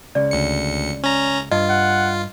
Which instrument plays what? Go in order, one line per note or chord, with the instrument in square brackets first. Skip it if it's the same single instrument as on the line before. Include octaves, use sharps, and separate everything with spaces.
[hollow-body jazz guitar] C#2 C#3 [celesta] D5
[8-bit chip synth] D2 C#7
C#4 A#5
[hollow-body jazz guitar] G2 [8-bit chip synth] F4 [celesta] D#5
[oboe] F#5